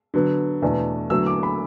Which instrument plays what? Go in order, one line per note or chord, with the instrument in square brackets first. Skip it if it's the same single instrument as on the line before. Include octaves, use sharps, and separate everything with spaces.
[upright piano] D3 F#3 B3
E2 B2 A3 D4
E2 D3 F#3 A3 E6
D6
B5